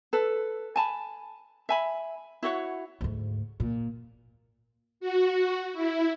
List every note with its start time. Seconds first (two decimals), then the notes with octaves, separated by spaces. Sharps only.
0.13 A4 B4
0.76 G#5 A5 B5
1.69 E5 G#5 B5
2.43 E4 F#4 C#5 F#5
3.01 D2 G#2
3.60 A#2
5.00 F#4
5.73 E4